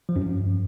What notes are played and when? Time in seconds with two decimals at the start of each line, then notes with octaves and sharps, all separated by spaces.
0.09 F3
0.16 F#2
0.23 G2